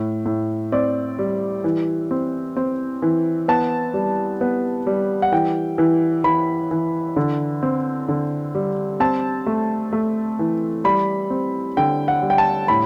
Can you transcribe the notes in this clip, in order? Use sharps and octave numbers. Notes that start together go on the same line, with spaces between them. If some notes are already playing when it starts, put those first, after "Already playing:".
Already playing: A2
A2
C4 D5
G3
E3
C4
C4
E3
B3 A5
G3
B3
G3
F#5
E3 G5
E3
E3 B5
E3
D3
C4
D3
G3
C4 A5
A3
A3
E3
G3 B5
C4
D3 G5
F#5
G3
G5
A5
A2 B5